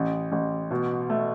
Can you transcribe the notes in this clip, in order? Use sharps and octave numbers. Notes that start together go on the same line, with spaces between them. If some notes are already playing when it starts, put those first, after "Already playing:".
Already playing: A1
A1
B2
A3